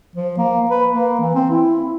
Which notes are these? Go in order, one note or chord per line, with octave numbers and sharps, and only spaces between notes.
F3
A#3
B4
A#3
E3
C4
E4